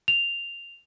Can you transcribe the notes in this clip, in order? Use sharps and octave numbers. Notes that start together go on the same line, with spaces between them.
F7